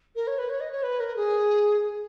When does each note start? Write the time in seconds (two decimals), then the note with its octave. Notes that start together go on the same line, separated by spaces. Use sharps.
0.15 A#4
0.27 C#5
0.38 B4
0.49 C#5
0.60 D#5
0.71 C#5
0.82 B4
0.99 A#4
1.16 G#4